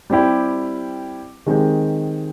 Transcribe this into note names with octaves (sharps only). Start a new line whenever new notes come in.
G3 C4 E4 G4
D#3 G#3 C4 D#4 G4